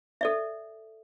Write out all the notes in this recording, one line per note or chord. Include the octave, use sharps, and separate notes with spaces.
A4 D5 E5